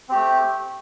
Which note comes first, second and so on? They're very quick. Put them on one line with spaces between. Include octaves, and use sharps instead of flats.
C4 G4 A3